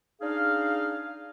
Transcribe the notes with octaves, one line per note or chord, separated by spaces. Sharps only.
D4 D#4 G#4 F5